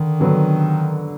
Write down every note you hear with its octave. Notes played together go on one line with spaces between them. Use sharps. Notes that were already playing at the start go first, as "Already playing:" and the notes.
Already playing: D3 D#3
D3 F#3 B3 D4